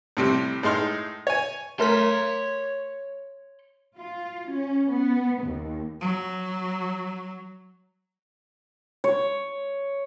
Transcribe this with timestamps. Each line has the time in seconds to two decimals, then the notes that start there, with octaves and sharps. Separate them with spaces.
0.17 A2 C3 G3
0.63 A2 G#3 D#4 C6 F6
1.27 C#5 G#5
1.79 A3 A#4 C#5 C6 B6
3.97 F4
4.51 C#4
4.92 B3
5.44 D#2
6.01 F#3
9.04 C#5